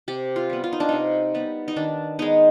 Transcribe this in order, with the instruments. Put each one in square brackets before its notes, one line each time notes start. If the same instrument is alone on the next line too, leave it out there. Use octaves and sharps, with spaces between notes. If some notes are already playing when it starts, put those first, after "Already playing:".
[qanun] C3 G4
F4
G3 B3
F4
D#4
D4
C3 D#4
G3 B3
D#4
D#3 D4
G#3 B3 D#4